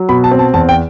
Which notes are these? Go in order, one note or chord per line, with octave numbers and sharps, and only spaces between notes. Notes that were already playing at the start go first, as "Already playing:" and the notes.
Already playing: F#3
B2 B5
A5
C4
A5
E2 A5
G5